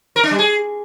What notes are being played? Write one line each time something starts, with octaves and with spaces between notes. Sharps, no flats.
A#4
D4
G3
G#4